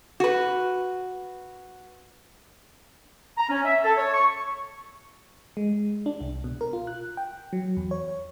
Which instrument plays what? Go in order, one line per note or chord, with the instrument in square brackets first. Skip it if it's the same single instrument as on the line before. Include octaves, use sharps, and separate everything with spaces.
[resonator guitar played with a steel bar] F#4 B4
[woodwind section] A#5
C#4
E5
A4
C#5
C#6
[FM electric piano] G#3
D4
C2
B2
A#4
F4
F#6
G5
F#3
E2
C#5